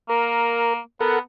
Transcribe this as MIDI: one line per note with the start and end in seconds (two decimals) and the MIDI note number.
0.10 0.79 58
0.10 0.73 70
1.01 1.18 59
1.01 1.19 69
1.01 1.19 70
1.01 1.19 78